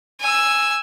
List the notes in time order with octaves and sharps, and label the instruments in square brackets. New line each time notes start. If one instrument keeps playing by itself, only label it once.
[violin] G#5 E6